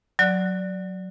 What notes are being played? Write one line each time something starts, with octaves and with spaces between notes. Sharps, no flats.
F#3 D5 F#6